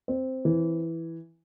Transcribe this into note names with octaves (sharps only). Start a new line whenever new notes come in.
C4
E3